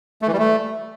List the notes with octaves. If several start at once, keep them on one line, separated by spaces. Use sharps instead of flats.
A3
E3
G3
A3